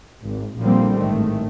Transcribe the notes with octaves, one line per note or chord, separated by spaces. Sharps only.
G#1
A#1 D3 F3 G3 A#3 C4
A1 G#2 D#3 A3